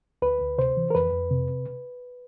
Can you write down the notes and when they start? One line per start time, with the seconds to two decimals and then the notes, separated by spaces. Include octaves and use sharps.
0.22 D2 B4
0.41 D2
0.58 C3 C5
0.77 E3
0.90 A#4
0.95 F2 B4
1.13 F2
1.31 C3